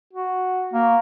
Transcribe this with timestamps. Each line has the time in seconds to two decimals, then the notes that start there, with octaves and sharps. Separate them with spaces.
0.13 F#4
0.73 A#3